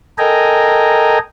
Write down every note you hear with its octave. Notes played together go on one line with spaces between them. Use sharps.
A4 A#4 D#5 G5 G#5 A#5